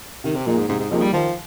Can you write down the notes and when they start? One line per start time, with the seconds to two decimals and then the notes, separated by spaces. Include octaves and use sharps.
0.24 C3 D#3
0.35 C3
0.46 A#2 F3 A#3 D#4 G#4
0.58 G#2
0.69 G#2 C3
0.79 G#2
0.91 C3 F3 A#3 D#4 G#4
1.02 G3
1.13 D#3 F3